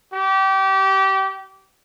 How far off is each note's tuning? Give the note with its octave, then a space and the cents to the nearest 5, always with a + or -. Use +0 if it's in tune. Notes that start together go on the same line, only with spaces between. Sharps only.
G4 -25